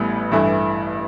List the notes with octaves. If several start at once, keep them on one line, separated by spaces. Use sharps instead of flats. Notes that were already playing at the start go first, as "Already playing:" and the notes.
Already playing: A1 A2 G3 B3
A1 G2 E3 A3 E4